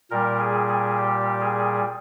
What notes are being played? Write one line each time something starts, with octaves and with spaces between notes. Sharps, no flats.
A#2 G3 A#4
G#4
G#4
G4
G#4